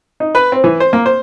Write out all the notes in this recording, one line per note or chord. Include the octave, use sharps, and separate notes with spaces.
D#4
B4
C4
E3
C5
A#3
C5